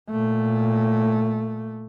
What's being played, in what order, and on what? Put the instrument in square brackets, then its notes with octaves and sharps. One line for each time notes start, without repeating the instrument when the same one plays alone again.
[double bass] A#2 A3